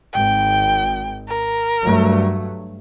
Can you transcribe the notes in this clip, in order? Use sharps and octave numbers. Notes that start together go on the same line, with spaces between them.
G#1 G5
A#4
G2 F#3 A3